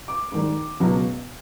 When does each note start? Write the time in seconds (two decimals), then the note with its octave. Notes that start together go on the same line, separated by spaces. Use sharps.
0.08 D6
0.32 G#2 D#3 G3
0.80 C#2 B2 F#3